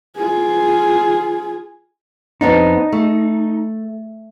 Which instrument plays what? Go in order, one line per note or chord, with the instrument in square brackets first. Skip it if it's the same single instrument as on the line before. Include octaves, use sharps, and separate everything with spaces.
[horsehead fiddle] F4 G#4
[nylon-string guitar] F2 B3 D4 [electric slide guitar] D#4
[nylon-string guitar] A3